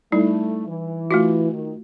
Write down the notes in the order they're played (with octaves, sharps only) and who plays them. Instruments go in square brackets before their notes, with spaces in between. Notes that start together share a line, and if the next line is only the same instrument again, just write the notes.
[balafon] G3 D#4 E4 [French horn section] A3
[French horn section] E3
[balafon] A3 F4 F#4
[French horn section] D#3